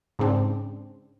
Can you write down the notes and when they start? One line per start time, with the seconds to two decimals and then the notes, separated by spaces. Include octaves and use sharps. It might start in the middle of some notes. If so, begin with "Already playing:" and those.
0.19 G#2 C#3 C4 D4